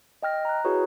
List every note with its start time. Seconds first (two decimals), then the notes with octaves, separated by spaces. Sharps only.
0.22 D#5 G5 F6 A#6
0.45 A#5 F#6
0.64 E4 F#4 G#4 B4 C#5